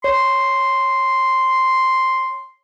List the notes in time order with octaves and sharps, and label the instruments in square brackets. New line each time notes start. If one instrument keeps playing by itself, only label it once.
[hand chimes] C#5 [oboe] C6